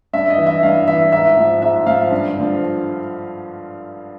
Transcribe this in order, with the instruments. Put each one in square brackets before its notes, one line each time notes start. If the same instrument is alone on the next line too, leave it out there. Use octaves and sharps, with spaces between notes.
[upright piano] G2 E5
D#5
E3
E5
G2 F5
E3 E5
G#2 E5
F3
G#2 E5
F3 F5
G2
D3 F3